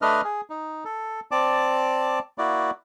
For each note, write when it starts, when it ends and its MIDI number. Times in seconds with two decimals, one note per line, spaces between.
0.02 0.21 57
0.02 0.21 62
0.02 0.21 71
0.02 0.21 75
0.02 0.21 89
0.24 0.41 68
0.50 0.84 63
0.85 1.20 69
1.31 2.19 60
1.31 2.19 74
1.31 2.19 81
1.31 2.19 86
2.38 2.71 58
2.38 2.71 64
2.38 2.71 66
2.38 2.71 74